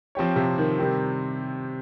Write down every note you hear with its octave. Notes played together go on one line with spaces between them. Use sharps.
F3 C4 G4 C#5
C3
D#3
C3 D#3 G3 C4 G4